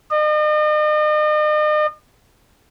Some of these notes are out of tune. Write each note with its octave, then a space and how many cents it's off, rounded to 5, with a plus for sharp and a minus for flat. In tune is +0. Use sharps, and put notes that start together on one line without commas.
D#5 -40